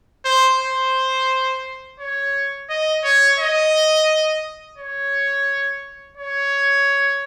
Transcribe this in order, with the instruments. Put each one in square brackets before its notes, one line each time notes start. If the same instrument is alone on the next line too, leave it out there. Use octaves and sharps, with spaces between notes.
[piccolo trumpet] C5
C5
C#5
D#5
C#5
D#5
C#5
C#5